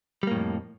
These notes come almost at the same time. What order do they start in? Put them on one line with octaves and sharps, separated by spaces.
G3 A#3 A2 F2